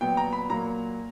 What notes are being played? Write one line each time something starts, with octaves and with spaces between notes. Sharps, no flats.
A#2 F#3 B3 G5
A#5
B5
A#2 F#3 A#3 A#5